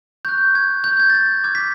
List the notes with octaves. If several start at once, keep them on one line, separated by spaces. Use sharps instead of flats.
C#6 F#6 G6
G#6
G6
G#6
A6
G#6
B5 D6 F6 G#6
B6